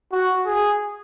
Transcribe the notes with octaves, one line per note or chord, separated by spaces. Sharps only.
F#4
G#4